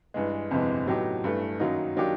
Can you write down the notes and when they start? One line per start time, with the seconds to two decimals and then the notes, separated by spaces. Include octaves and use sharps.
0.14 G2 E3 G#3
0.51 G1 F2 C3 E3 G#3
0.87 A2 F#3 B3 D#4 G4
1.24 G2 E3 A3
1.59 F#2 D#3 F#3 A#3 D#4
1.97 D#3 F#3 A#3 D4 G4